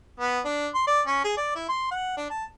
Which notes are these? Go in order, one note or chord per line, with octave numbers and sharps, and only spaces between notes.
B3
D4
C6
D5
C#4
G#4
D5
E4
C6
F#5
D4
A5